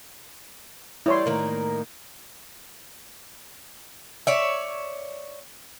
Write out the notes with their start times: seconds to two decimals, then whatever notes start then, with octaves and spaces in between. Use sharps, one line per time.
1.06 G3 E4 C#5 C6
1.26 A2 D#3 A#3
4.27 C#5 D5 E5